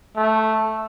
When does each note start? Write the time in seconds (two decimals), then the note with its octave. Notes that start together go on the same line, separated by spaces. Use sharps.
0.16 A3